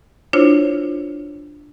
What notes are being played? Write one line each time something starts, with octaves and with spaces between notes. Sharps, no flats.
D4 E4 F4 C5 C#5